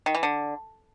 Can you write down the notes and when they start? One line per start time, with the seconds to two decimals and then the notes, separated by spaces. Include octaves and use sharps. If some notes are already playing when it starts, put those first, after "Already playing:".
0.06 D#3
0.15 E3
0.23 D3